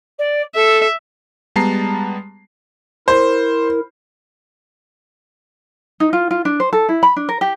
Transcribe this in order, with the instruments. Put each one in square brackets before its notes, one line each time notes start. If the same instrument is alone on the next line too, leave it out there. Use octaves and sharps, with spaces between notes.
[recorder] D5
[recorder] A4 [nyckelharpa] E5
[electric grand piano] G3 G#3 B3 A5 A#5 C7
[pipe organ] E4 A#4 [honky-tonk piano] C5
[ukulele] D#4
F4
F4
D4
C5
A4
E4
B5
D4
A#4
G4